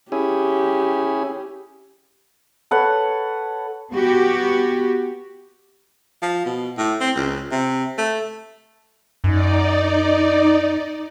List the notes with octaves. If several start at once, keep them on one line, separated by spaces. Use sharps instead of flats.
C#4 E4 G4 G#4
A4 B4 C#5 F#5
B3 F#4 G4
F3
B2
A2
C4
C#2
C3
A3
F#2 D#4 D5